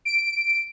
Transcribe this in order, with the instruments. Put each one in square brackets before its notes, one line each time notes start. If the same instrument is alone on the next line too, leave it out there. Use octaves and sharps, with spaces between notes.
[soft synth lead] D7